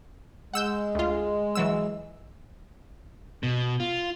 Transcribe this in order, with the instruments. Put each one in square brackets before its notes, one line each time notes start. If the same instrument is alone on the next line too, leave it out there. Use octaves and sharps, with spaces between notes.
[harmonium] G#3 [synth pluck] F#5 E6 G6
[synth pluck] D2 F4
E3 F#3 E6
[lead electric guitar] B2
F4